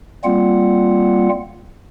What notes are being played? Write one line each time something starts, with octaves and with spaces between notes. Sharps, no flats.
G3 A#3 C4 F4 F#5